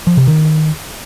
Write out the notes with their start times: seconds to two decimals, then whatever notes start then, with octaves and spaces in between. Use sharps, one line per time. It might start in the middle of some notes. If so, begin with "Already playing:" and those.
0.07 F3
0.17 C3
0.27 D#3